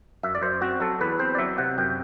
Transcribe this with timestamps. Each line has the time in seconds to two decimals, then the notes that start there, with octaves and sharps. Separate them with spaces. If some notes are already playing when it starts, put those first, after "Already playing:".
0.23 F#2 E5
0.35 D5
0.42 F#2 C5
0.61 C4 F#4
0.80 F#3 A4
1.01 E2 B4
1.19 C4 C5
1.35 D5
1.39 F#3 E5
1.58 C3 F#5
1.78 F#2 G5